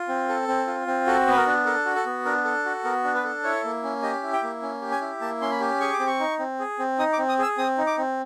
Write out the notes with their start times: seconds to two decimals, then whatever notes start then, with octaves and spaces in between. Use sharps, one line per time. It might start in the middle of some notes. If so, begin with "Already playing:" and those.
Already playing: F4
0.09 C4
0.29 A4
0.48 C4
0.67 F4
0.87 C4
1.07 F#4 A4
1.27 B3 B4
1.37 A#4
1.46 D4
1.66 A4 A#4
1.85 F#4
1.96 A4
2.06 B3
2.25 D4 A#4
2.45 A4
2.65 F#4
2.84 B3 A#4
3.04 D4
3.15 B4
3.24 A4
3.44 E4 C#5
3.64 A#3
3.83 C#4
4.02 G4 D#5
4.23 E4
4.33 G5
4.43 A#3
4.62 C#4
4.82 G4
4.91 G#5
5.01 E4
5.21 A#3 A5
5.41 C#4 C6
5.51 B5
5.60 G4
5.81 G#4 C#6
5.93 D6
6.00 C4
6.07 C#6
6.20 D#4
6.39 C4
6.59 G#4
6.79 C4
6.99 D#4 D#6
7.13 D6
7.18 C4
7.29 D#6
7.39 G#4 E6
7.58 C4 D#6
7.78 D#4
7.87 D6
7.98 C4